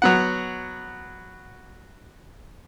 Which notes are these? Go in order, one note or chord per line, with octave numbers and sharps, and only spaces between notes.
F#3 B3 F#5